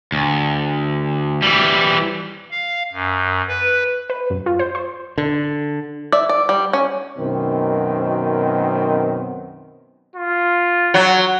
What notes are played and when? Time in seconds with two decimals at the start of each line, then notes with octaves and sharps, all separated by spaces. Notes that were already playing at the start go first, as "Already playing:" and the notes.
0.12 D2
1.42 E3 G3
2.51 F5
2.93 F#2
3.48 B4
4.10 B4
4.30 F#2
4.46 F4
4.59 C5
4.75 C5
5.18 D3
6.12 D5 E5
6.29 D5
6.49 G3
6.73 C#4
7.18 F#2 B2 D#3 C4
10.16 F4
10.94 F#3